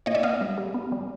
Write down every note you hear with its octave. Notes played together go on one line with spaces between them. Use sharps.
A#2 C#5 D#5
D5 E5
B3 D#5 F5
G3
G3
B3
G3